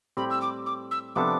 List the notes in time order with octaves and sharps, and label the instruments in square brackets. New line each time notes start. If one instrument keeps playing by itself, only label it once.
[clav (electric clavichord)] A2 G3 C4 G4 [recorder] B5
[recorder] E6
D6
D6
E6
[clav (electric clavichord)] C3 F3 B3 D4 A4 [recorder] D6